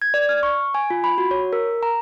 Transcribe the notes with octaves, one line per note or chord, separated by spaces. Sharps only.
G#6
D5
F6
C#6
G#5
F4
B5
F#4
C#5
A#4
A#5